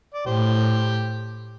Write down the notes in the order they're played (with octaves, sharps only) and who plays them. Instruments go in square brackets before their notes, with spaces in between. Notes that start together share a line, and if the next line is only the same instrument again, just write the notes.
[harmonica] D5
[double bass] A2 [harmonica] G4 C5